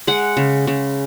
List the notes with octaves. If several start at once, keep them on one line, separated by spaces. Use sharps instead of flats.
G#3 F#5
C#3
C#3